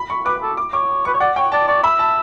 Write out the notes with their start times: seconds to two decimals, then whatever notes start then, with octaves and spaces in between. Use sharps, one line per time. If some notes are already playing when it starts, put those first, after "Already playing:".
Already playing: B5
0.10 C#6
0.25 B4 D6
0.42 A4
0.57 D6
0.73 C#5 D6
1.05 B4 C#6
1.14 C#5
1.20 D5 F#5
1.36 C#5 G5
1.52 D5 A5
1.68 D5 C#6
1.83 E5 B5
1.99 A5